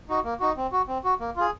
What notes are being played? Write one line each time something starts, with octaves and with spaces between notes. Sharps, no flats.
D#4 F#4
A#3
D#4 F#4
C4
F#4
C4
F#4
A#3
F4 G#4